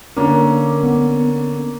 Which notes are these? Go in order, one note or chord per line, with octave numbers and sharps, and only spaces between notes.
D3 A#3 C#4
B3